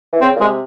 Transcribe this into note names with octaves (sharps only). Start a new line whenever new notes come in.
E3
C#3 C4
A#2
C3 G#3